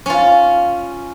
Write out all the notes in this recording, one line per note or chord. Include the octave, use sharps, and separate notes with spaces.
C#4 F4